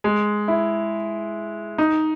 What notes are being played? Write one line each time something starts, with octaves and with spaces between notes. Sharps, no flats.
G#3
E4
D#4